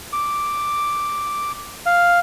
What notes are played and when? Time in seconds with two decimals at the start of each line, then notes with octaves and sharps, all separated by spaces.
0.13 D6
1.86 F5